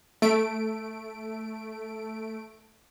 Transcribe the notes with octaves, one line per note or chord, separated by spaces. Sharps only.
A3 D7